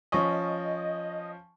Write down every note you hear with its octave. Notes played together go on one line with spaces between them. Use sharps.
F3 C#4 D#5 G#5 C#6